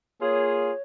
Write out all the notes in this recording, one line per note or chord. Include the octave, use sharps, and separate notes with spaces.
A#3 F4 G#4 C#5